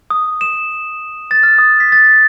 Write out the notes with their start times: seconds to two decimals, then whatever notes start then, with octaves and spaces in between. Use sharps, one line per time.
0.10 D#6
0.41 E7
1.31 A6
1.43 F6
1.59 D#6
1.80 B6
1.92 A6